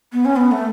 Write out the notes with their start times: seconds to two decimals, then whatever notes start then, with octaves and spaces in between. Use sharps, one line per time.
0.13 B3
0.25 C#4
0.36 B3
0.52 A3